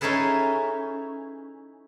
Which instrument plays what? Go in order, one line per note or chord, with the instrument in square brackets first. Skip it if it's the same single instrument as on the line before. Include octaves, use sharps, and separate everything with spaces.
[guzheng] C#4 D#4 E4 G#4 A4 B4